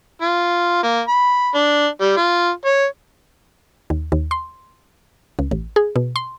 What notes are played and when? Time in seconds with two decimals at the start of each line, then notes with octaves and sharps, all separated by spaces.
0.22 F4
0.83 A#3
1.08 B5
1.54 D4
2.01 G3
2.17 F4
2.66 C#5
3.90 D#2
4.12 D#2
4.31 C6
5.39 C#2
5.51 A1
5.76 G#4
5.96 B2
6.16 C6